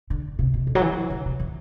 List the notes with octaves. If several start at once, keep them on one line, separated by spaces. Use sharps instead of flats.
D3
C3
B2
D3
F#3
E3
D3
C3
E3